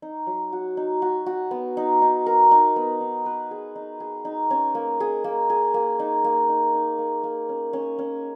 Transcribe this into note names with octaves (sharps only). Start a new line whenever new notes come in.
D#4
F#3
F#4
D#4
F#4
F#4
B3
D#4
D#4
A#4
D#4
B3
D#4
B4
G#4
D#4
G#4
D#4
C#4
A#3
G#4
A#3
G#4
A#3
D#4
A#3
D#4
D#4
A#3
A#3
C#4
C#4
C#4